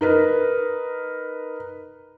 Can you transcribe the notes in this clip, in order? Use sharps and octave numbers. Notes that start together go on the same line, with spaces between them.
D#4 A#4 B4